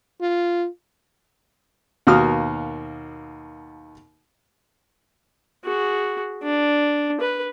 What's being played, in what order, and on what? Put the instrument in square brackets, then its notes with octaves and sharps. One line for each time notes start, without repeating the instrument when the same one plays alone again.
[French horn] F4
[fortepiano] D#2 B2 A#3 F#4 D#6 F6
[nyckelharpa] F#4 G#4
D4
B4